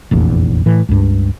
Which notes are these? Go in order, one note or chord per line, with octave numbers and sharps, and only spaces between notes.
F1 A#1 E2
A2 E3
C#2 G2